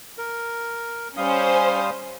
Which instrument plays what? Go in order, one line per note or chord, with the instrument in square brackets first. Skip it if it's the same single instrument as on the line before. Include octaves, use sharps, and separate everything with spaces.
[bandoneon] A#4
[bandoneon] G3 F5 D#6 [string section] C#4 C5